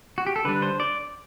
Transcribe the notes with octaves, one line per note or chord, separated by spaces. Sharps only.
F#4
G4
A4
D3 G3 D4 B4
C5
D5